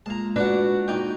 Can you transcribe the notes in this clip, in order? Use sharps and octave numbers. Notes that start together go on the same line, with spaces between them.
G#3 A#3 F4 A5 A#5
D4 F#4 B4 D5 F#5
A#2 D#4 D5 G5 F#6